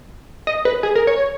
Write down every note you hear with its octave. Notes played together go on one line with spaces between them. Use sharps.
D#5
B4
G#4
A#4
C#5